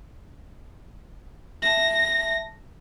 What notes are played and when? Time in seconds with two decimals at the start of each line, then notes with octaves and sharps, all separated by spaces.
1.62 E5 A5 A#6